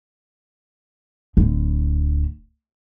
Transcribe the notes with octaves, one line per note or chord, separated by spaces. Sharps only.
D1 D3